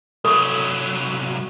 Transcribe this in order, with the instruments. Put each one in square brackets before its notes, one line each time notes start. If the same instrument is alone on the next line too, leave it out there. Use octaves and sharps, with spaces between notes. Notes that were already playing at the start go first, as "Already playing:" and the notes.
[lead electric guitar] C2 F#3 [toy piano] A4 C#6